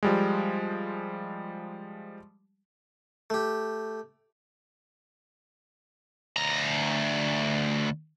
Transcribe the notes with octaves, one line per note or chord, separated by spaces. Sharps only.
F3 G3 G#3
A3 G4
D2 A#5